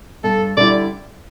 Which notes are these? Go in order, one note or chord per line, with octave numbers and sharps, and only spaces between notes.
G2 A4
D3 G3 E4 D5